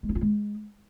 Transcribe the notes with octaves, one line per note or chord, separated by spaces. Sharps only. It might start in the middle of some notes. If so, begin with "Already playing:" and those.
G#3
E4
F4
G#3